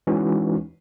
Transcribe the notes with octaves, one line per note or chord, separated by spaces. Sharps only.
E3 G#3 C#4 D#4 F#4